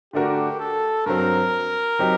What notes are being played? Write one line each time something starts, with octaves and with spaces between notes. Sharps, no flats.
D3 A3 D4 F#4 G4 A#4
A4
G2 F#3 C4 A#4
F#3 C4 D#4 G4